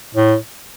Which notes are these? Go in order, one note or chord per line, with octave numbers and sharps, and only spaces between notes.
A2